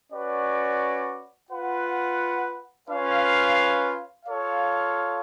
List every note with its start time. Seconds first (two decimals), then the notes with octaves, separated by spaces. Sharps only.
0.13 C#4 F#4 B4 D5
1.50 F4 B4 F#5
2.88 C#4 F4 B4 F5
4.26 F4 A4 C#5 F5